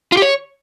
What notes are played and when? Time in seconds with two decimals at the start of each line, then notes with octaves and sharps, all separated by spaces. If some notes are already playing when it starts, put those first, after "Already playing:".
0.12 F4
0.17 G4
0.22 C#5